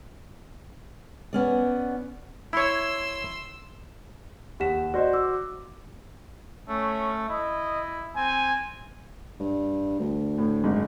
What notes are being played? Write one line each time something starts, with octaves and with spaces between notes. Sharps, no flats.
B3 C#4 D5
E4 C#5 C6 E6
D#2 G4 F#5 B6 E7
F#4 C5 D5 D#5
D6 E6
A3 C#4
E4 D#5
C4 G#5
G2
D2
A2
F#1 G#2